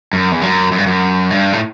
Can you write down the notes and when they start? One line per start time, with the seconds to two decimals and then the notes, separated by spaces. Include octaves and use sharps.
0.13 F#2
0.32 E2
0.42 F#2
0.71 F#2
0.78 G2
0.87 F#2
1.30 G2
1.53 A2